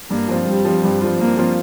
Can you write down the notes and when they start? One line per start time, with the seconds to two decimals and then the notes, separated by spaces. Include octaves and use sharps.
0.10 G2 A#3
0.28 F3 C4 F4
0.47 G2 G3
0.65 F3 C4 F4
0.84 G2
1.01 F3 C4 F4
1.19 G2 A#3
1.37 F3 C4 F4